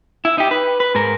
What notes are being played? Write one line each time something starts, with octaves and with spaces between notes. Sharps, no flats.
E4
D#4 G4
B4
B4
G#2 A#4